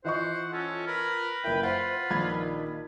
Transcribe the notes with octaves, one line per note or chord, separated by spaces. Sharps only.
E3 F4 C5 D#5 F#5 C#6
C#4 A4
A#4 B4
F#1 E4 A#4 G5
F4 B4 C5 F#5
A#1 D#3 B5 G#6